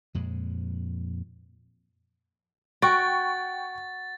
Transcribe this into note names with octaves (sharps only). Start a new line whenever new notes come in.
F2 A#2 G#3
F#4 G5 C#6 A6 D7